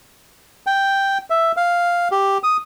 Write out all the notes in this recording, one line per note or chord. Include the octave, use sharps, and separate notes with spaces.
G5
E5
F5
G4
D#6